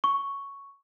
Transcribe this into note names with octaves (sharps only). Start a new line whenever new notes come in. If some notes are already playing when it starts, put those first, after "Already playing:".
C#6